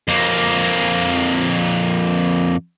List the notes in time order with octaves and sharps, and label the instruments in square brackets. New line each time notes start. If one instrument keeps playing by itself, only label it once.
[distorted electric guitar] F2 A#3